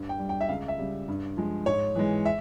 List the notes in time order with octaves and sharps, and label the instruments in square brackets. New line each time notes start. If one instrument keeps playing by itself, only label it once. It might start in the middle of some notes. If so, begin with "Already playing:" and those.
Already playing: [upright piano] G2
G5
G3
G5
E5
C#2 F5
E5
C#3 G3
G2
F3 G#3
G#2 C#5
E3 G#3
E5